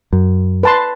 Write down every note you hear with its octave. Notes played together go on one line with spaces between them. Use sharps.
F#2
B4 A5 C6